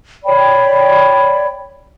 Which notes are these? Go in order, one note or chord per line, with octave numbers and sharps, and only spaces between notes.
C#5 D5 G5 B5